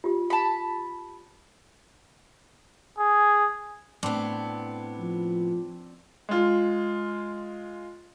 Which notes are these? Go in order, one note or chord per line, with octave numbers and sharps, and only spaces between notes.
F4 G4
A5 B5
G#4
A2 B3 C4 D4
F3
G#3 F4